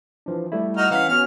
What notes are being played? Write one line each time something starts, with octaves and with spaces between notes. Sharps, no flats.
E3 F3 D4
G3 A3 E4
D#4 F#4 F6
E3 C#4 F5 F#5 B6
B3 C#4 F#4 F6